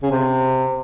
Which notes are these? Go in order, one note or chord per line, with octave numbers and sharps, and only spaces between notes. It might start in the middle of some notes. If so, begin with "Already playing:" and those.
C#3
C3